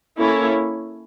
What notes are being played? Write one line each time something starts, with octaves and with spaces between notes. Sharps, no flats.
A#3 C#4 E4 A4 C#5